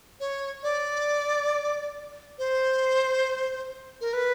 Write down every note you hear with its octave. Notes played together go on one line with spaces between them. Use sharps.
C#5
D5
C5
A#4
B4